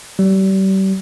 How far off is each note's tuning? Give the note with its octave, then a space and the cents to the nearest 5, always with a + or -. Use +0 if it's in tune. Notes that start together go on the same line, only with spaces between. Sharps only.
G3 -35